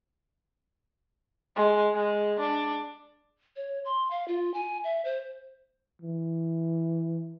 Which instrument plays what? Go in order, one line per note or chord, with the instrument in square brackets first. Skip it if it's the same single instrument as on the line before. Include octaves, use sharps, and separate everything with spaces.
[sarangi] G#3
G#3
D4
[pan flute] C#5
C6
F5
F4
G#5
E5
C5
[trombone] E3